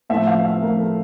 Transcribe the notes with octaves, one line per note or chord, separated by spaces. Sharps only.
A2 F3 A3 E5
F5
E5
A2 F3 A3 A#4
A4